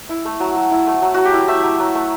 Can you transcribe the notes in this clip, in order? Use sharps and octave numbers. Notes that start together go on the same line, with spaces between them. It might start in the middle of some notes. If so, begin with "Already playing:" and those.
E4
A3
F#3
F#3
E4
A3
F#3
F#3 F#4
G4
E4
A3 E5
F#3
F#3
A3